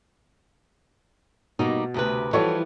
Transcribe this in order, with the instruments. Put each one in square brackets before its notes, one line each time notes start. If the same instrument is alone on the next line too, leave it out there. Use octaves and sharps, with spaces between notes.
[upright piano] B2 [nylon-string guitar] G3 A#3 D#4
[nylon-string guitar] D2 C3 B4
[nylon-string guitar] E3 F3 G3 [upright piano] F#4 A4 C#5